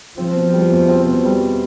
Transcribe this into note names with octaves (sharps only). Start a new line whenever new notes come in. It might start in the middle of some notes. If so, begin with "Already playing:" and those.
F3 C4
B2
G3
E2
C4
B2
G3